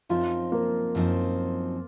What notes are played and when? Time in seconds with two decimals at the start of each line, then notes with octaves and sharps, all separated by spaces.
0.09 F#2 F3 C4 D#4 F4
0.52 A#3
0.95 F#2 F3 C4 D#4